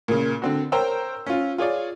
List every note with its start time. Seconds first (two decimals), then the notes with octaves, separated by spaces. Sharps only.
0.08 A#2 C#3
0.42 D3 C4 F#4
0.72 A#4 C5 C#5 G5 A#5 E6
1.26 C#4 F4
1.58 F4 G#4 C#5 D5